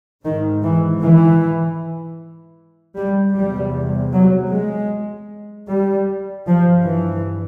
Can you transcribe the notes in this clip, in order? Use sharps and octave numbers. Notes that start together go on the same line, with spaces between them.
G#2 D#3
E3
E3
G3
E2 C3 G3
F#3
G#3
G3
G2 F3
E3